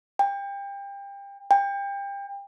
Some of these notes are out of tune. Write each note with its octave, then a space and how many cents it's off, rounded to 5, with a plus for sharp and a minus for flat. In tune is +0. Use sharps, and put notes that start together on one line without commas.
G5 +30
G5 +30